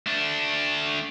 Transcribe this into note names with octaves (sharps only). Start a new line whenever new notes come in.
A3 D4